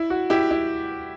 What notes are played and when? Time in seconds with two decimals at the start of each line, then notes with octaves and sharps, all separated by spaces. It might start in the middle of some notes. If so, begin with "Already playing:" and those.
Already playing: E4
0.10 F#4
0.30 E4 G4
0.51 E4